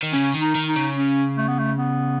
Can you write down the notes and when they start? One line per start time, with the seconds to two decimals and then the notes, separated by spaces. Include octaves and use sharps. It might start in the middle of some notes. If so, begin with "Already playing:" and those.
0.03 D#3
0.13 C#3 C#4
0.34 D#3
0.41 D#4
0.55 D#3
0.69 D#4
0.76 C#3
0.96 C#4
1.37 A3
1.48 B3
1.59 A3
1.78 B3